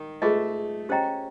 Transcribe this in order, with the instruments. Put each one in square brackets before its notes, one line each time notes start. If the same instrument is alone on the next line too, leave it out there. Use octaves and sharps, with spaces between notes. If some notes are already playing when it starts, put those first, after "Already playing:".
Already playing: [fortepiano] D#3
[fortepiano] A3 [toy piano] F4 G#4 B4 D#5
[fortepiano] C#4 [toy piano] G4 C5 D#5 G5 A#5